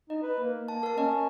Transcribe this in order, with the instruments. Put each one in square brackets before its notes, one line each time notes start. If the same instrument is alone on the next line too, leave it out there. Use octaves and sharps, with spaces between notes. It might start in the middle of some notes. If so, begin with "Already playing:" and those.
[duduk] D#4 [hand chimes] D#5
[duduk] B4
A#3
[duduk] A#3 [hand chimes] A5
[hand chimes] A#4 A5
[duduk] C#4 [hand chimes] D#5